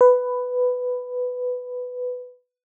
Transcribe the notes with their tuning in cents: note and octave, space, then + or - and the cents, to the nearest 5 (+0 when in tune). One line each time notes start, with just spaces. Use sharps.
B4 +10